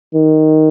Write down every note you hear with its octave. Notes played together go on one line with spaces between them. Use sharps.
D#3